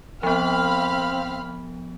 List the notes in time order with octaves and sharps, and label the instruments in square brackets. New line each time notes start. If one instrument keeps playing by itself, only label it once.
[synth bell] F3 B3 [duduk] C4 [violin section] F5 B5 F6